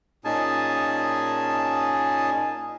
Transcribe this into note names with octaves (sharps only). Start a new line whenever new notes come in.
A#2 C#4 D#4 G#4 G#5 A5